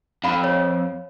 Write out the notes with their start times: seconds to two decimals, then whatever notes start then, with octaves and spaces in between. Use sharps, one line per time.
0.24 F2 F5 B5
0.44 C#5